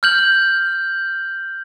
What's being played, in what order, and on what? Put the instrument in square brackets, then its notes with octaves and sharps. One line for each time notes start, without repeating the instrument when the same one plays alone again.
[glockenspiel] F6 G6 F#7